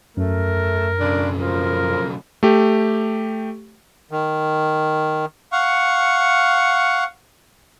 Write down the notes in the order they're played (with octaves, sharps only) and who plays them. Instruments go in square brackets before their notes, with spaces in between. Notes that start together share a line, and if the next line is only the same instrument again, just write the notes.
[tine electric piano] F#2 [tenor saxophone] A3 [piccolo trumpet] A#4
[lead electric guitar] B1 C#3 [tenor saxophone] D4
[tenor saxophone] F3 [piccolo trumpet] A#4
[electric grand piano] A3 G4
[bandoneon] D#3
[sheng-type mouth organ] F5 F#5 C#6